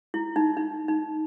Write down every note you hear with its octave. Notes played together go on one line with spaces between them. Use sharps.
E4
D#4
D#4
D#4